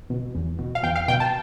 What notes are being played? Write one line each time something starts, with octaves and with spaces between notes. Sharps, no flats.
B2
E2
B2
F5
E2 G5
F5
B2 G5
A5